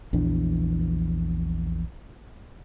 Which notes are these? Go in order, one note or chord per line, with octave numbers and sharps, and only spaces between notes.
A#1 E2 E3 D4